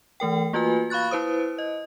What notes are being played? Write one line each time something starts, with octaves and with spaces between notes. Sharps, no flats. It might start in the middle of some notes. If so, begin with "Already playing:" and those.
E3 A3 A#4 G5
A#3 F4 F#4 B4 G#5
F5 B5 C#6 F#6 A6
E4 B4 C5 D#6
D#5